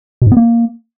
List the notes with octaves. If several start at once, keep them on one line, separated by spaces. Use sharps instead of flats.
B2
G#2
B3
A#3